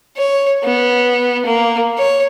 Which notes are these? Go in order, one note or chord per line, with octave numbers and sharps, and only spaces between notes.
C#5
B3
A#3
C#5